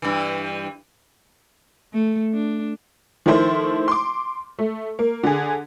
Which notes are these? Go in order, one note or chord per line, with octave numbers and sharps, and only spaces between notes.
G2 E3
A3
D4
D#3 F3 A3 E4 C5
C6 D6
A3
A#3
D3 G#4